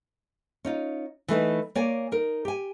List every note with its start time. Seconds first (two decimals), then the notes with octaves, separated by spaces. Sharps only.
0.65 C#4 D#4 F4
1.28 E3 A3 D#4 B4
1.75 A#3 C#5 D5 G#5
2.12 D#4 A#4
2.45 G4 G#5